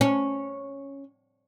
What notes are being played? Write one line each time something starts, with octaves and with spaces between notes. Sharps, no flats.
C#4